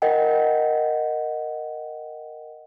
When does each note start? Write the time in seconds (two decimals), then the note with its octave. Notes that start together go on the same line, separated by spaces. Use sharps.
0.02 A#4 D#5 F#5 G5